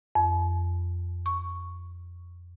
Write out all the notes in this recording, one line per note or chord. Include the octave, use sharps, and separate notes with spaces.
F2
C#6